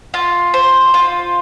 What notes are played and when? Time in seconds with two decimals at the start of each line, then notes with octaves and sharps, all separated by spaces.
0.14 F4
0.54 C5
0.94 F4